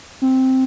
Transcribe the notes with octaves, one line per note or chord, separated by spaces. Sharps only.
C4